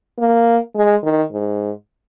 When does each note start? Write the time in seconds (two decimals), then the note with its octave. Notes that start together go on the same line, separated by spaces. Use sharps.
0.19 A#3
0.75 G#3
1.03 D#3
1.32 G#2